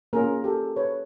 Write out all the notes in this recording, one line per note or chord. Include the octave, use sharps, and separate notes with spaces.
A#3 C#4 F4 G#4 A#4
G4 A4
B4 C#5